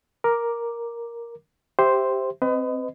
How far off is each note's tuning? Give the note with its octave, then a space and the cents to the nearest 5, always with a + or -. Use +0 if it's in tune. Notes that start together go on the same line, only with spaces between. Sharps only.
A#4 +5 D6 +0
G4 +0 C5 +0 E5 +0
C4 +0 B4 +35 D#5 +0